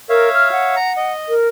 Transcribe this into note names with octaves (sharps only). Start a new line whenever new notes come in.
A#4 C#5 E5 F5
F6
F#5
A#5
D#5
A#4